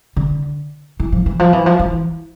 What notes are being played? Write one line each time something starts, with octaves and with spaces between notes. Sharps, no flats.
D3
E3
F3
E3
F3
E3
F3
E3